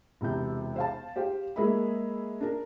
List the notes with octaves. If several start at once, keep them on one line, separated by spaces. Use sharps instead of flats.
E1 C3 G6
C5 F5 A5
G4 C5 F5 G5
G#3 A#3 G#4 E5 B5
D4 A#4